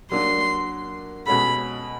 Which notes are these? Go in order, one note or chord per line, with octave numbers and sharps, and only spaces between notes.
F#3 A#3 D4 C6
B2 G#3 C#4 F#4 A4 B5